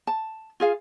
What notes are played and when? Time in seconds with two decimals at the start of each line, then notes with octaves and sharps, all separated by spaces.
0.07 A5
0.60 F4 G#4 F5